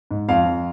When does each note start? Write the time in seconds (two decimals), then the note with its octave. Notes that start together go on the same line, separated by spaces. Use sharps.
0.11 G#2
0.29 F2 F5
0.45 F2